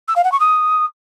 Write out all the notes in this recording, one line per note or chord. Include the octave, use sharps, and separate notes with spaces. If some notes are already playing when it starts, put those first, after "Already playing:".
E6
F5
F#5
C#6
D#6